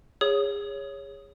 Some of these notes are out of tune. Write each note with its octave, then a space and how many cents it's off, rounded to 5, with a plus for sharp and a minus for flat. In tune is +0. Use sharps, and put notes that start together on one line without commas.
G#4 -30 C#5 +0 D#6 +0